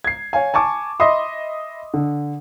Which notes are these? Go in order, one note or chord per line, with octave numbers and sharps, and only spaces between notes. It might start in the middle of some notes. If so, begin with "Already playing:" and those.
G#6 C7
C#5 F5 G#5
G#5 A5 C#6 D6
D#5 E5 B5 C6 D#6
D3